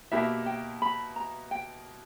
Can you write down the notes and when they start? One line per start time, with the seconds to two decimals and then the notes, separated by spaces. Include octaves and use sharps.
0.11 B2 A#3 E4 G4 E5
0.46 G5
0.82 B5
1.16 A#5
1.51 G5